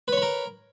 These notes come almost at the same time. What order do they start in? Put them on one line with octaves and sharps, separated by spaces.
B4 C#5 B5 A#4